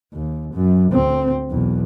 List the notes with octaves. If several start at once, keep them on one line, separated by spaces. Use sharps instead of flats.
D#2
F#2
D2 C4
B1 E2